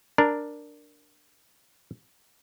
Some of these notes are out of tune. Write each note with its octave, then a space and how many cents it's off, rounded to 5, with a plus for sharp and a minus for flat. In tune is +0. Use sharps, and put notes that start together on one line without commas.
D4 +5 A#4 +0